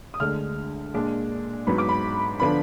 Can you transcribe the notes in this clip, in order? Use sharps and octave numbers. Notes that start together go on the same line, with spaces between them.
D#6
D2 D3 G#3 F6
A#2 G#3 D4
G#2 F#3 B3 B5
D6
B5
D3 F3 B3 D4 B5